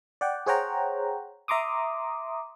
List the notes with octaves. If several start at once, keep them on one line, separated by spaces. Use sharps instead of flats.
D5 F#5 G5
G#4 C5 C#5 F#5 G5 A#5
E5 A#5 C6 D6 D#6